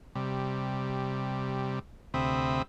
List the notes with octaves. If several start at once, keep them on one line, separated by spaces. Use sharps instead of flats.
C3 G3
D2 C3 C4 E5 B5 D#6